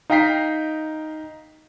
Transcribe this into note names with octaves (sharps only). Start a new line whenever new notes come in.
D#4 F5 G5 A#5 B6 C7